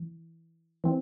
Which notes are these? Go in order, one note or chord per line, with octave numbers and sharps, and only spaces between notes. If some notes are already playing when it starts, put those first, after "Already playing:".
Already playing: E3
E3 C4